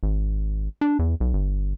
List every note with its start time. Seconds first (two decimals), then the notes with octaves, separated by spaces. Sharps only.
0.03 G#1
0.81 D4
0.99 E2
1.20 B1
1.33 G1